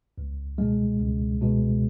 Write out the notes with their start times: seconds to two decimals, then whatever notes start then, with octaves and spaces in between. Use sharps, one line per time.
0.18 C#2
0.58 B2 G#3
1.00 C#2
1.41 B2 G#3